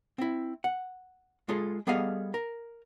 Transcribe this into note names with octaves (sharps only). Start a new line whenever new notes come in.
C4 E4
F#5
G#3 F4 G#4 A4
G3 B3 G#4 A4 D#5 F5
A#4